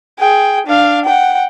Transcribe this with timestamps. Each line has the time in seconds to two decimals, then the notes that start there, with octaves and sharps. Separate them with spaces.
0.19 G#4 G5
0.66 D4 F5
1.05 F#5 G5